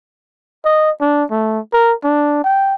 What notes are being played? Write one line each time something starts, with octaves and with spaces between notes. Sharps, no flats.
D#5
D4
A3
A#4
D4
G5